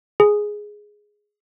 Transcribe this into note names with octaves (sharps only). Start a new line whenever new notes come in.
G#4